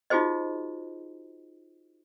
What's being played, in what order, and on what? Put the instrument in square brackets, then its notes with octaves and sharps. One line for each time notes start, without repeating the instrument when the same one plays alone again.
[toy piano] D#4 F4 F#4 G#4 C5 D#5